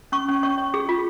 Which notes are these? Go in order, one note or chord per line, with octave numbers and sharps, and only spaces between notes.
C#4 C#6
C#4
C#5 C#6
C#5
G#4
F4